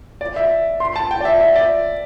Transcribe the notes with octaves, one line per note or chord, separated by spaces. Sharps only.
D5
E5
C6
A5
G5
D5
E5
E5
D5